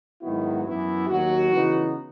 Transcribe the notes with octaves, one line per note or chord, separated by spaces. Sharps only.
G#2 D#3 F#3 B3 E4 F#4
F#2 E3 B3 E4
D#2 D#3 F#3 F#4
C#3 E3 B3 D#4